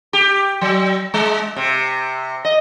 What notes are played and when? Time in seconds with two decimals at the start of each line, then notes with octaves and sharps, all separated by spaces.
0.13 G4
0.61 F#3
1.14 G#3
1.56 C3
2.45 D#5